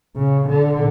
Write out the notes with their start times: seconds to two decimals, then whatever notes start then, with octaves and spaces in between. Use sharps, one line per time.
0.17 C#3
0.50 D3